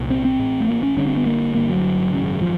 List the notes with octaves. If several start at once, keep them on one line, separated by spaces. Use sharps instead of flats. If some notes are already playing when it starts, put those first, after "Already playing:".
Already playing: C2 A#2
C4
C4
A1 A2
A3
A#3
C#4
G1 G2 D3 C#4
C4
B3
A#3
G1 G2 D3 A#3
F#3
G#1 F#2 C#3
F3